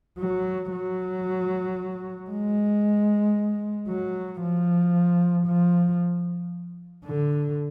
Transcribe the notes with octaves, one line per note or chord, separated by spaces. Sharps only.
F#3
F#3
G#3
F#3
F3
F3
D3